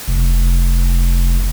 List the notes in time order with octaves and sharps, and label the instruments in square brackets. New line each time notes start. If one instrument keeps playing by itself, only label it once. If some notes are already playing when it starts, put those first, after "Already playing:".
[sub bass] F1